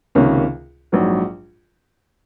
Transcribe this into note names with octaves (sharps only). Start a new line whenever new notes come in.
C#2 C3 D#3 A#3 C#4
A#1 G#2 F#3